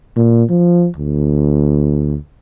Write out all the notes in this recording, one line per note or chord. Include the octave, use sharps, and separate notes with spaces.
A#2
F3
D2